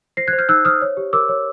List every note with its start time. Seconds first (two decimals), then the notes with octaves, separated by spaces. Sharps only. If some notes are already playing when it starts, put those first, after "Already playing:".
0.17 C5 A#6 C7
0.28 F#6 G#6
0.33 C5
0.38 F6 G6
0.49 D#4 E6 F#6
0.65 C5 D#6 F6
0.82 C#5
0.97 G4
1.13 A#4 D6 E6
1.29 C#5